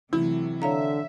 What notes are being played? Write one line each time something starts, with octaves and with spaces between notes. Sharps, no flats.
C3 E3 F#3 A3 E4
D3 C#5 E5 F5 A#5